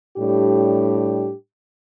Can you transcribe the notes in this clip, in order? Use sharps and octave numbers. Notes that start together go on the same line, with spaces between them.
A2 G3 D4 G4